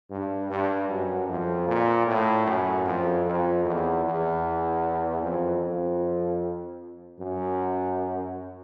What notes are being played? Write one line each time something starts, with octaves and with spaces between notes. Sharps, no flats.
G2
G2
F#2
F2
A#2
A2
F#2
F2
F2
E2
E2
F2
F2
F#2